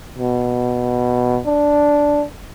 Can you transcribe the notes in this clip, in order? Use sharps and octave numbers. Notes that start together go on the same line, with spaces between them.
B2
D4